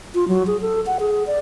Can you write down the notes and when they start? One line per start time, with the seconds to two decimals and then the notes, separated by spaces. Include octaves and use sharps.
0.15 F4
0.28 F#3
0.47 G#4
0.61 A4
0.86 F#5
1.00 G#4
1.27 D5